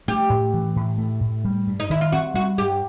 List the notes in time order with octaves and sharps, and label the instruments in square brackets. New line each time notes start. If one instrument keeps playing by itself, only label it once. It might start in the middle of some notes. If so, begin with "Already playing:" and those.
[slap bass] A3 [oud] G4
[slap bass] A2
E3
A2
A3
A2
G3
G2
[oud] D#4
[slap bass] D#3 [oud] E4
[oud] F4
[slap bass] C4 [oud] F#4
[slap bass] G3 [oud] F#4
[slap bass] G2 [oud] G4